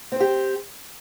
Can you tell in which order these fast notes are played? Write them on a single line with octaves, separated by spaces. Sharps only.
C4 C5 G4